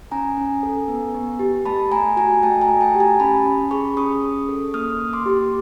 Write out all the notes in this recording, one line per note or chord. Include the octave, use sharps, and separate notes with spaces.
C#4 G#5 A#5
C#4
A4
B3
B3
G4
A3 A5 B5
A3 G#5 A#5
F#4 G#5 A#5
A3 G5 A5
G#5 A#5
A3
G5 A5
G4
G#5 A#5
C#4 A5 B5
C#4
G#4 B5 C#6
C#4 C#6 D#6
C#4
A4
A#3 D#6 F6
A#3
C6 D6
G4